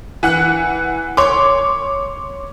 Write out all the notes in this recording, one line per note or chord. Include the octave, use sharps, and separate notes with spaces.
E3 F#5 F#6
C#5 C6 D6